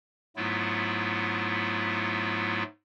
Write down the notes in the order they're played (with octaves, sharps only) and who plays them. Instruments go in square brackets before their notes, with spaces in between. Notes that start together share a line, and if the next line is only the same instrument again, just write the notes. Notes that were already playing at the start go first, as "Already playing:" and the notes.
[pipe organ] G#2 F#3 A3 B3 E4 F4